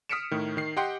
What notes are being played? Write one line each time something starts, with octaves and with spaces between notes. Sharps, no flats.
D#6 F6 B6 C#7 D7 E7
A2 D#3
D#3 C7
G4 D#5 F#5 G5 C6